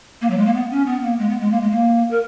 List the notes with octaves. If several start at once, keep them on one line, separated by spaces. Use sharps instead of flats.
A#3
F#3
G#3
A#3
B3
C#4
B3
A#3
G#3
B3
G#3
A#3
G#3
A#3
A#4